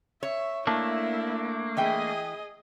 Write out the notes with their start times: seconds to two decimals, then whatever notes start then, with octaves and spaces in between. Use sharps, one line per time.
0.23 C#5 E5
0.67 A3 A#3 D4 E4
1.77 E3 G#4 D#5 E5 G5